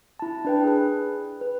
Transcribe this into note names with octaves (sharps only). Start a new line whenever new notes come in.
E4 A5
D4 B4 G5
G#4 B4
B4